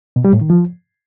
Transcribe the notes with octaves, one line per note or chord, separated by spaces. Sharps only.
B2
G3
A2
D#3
F3